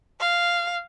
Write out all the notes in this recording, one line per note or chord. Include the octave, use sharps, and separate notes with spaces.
F5